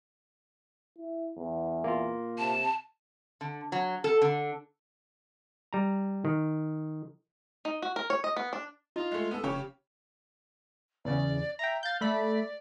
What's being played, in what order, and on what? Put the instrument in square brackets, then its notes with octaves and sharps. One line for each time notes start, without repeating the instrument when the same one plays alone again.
[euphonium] E4
E2
[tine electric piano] A#3 F4
[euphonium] C3 [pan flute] A5
[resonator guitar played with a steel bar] D3
F#3
A4
D3
[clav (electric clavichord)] G3 A#5
D#3
[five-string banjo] D#4
F#4
A#4
C#5
D#5
B3
D4
[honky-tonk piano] D#4 [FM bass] F4
[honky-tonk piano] G#3 A3
B3 A4
[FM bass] F1 [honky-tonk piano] C#3 G4 C#5
[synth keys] E2 C#3 [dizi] D5
[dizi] E5 [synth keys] G5 A#5
[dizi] F5 [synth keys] G6 A6
[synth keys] A3 B5 B6 [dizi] D5